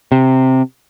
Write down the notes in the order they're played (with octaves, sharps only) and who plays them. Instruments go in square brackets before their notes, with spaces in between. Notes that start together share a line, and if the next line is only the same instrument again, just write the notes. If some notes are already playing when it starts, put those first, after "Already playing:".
[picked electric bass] C3